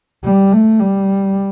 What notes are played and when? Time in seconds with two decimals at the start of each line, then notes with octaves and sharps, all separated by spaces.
0.24 G3
0.52 A3
0.80 G3